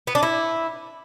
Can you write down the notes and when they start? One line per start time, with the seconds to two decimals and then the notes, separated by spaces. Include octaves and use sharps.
0.07 B3
0.15 D4
0.23 E4